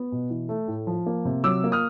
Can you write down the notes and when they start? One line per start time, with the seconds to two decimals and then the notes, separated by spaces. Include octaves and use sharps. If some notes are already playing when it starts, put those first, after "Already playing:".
Already playing: B3
0.12 B2
0.30 E3
0.49 A3
0.68 A2
0.87 F3
1.06 A#3
1.25 C3
1.44 F#3 D6 E6
1.64 A#3
1.72 D#6 F6